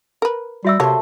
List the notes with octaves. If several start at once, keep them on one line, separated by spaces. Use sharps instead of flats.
A#4 B4
G3 F#4 E5 E6
C3 F#3 A3 A#3 C5 C#5